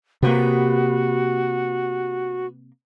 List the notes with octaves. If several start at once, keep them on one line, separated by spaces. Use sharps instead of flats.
C3 A#3 B3 F#4 G4